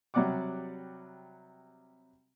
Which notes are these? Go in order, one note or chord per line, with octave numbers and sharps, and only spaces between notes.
C3 F#3 G3 D5 F#5 D6